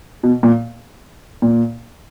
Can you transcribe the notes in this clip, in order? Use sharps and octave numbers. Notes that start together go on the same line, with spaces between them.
B2
A#2
A#2